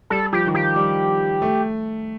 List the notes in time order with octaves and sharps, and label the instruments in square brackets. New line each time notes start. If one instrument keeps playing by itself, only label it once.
[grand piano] G3 [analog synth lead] A4
[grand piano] F3 [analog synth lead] G4
[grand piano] D#3
[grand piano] F3 [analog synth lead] G4
[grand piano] G3
A3